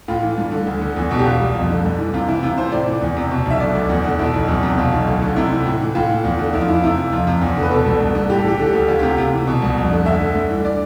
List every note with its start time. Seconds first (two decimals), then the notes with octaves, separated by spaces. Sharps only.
0.08 A2 F4
0.23 E3
0.37 G2
0.52 D3
0.67 D2
0.81 D3
0.96 E2
1.11 B2
1.19 G4
1.25 B2 F4
1.40 C2
1.55 F2
1.70 D3
1.84 G2
1.99 E3
2.14 C3 F4
2.28 E3 E4
2.43 C3 F4
2.58 E3 C5
2.72 A2 D5
2.87 E3
3.02 E2
3.16 C3
3.31 B2
3.46 B1 E5
3.60 D3 D5
3.75 D2
3.89 E2
4.04 D3
4.19 B2 E4
4.34 B1
4.48 E2
4.63 C3
4.78 B2 F4
4.92 B1
5.07 D2
5.22 D3
5.36 C3 E4
5.51 E3
5.66 A2
5.80 E3
5.95 A2 F4
6.10 E3
6.24 E2
6.39 D3
6.54 F2 E4
6.61 F4
6.68 E3 E4
6.76 F4
6.83 C3 E4
6.97 E3
7.12 F2 F4
7.27 C3
7.41 E2
7.57 D3
7.63 B4
7.71 B2 A4
7.86 C2
8.00 G2
8.15 D3
8.30 A2 G4
8.39 A4
8.44 E3 G4
8.58 D3 A4
8.66 G4
8.73 D2
8.88 D2 F4
8.99 C3 G4
9.10 F4
9.18 C3
9.33 E3
9.47 B2
9.62 C2
9.76 F2
9.91 D3
10.06 D2 E5
10.20 D3
10.35 G2
10.50 E3
10.65 D5